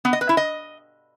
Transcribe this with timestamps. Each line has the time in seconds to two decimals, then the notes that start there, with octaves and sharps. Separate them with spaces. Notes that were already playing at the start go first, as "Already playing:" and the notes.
0.05 B3
0.13 D#5
0.21 B4
0.29 E4
0.37 D#5